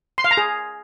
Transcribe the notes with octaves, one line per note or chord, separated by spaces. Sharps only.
C6
F5
A#5
G#4